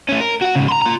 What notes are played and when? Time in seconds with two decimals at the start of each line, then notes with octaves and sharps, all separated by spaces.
0.09 A3 C#4
0.21 A#4
0.42 F#4 F#5
0.56 G#2 C#3
0.69 A#5 C6
0.82 F4 A#5